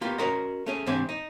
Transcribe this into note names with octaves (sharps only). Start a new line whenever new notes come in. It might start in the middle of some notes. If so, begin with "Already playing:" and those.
A#3 B3 F4 G4
C#4 F#4 A#4 C5 D#5
A3 C#4 G#4
G#2 E3 C4 D4 G4 G#5
D#4